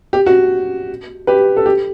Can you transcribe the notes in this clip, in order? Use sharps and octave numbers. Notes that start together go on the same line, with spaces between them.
G4
F#4
G4 B4
A4
G4